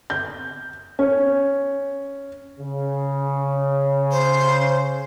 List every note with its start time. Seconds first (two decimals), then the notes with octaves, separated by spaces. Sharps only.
0.10 G6
0.99 C#4
2.59 C#3
4.11 C5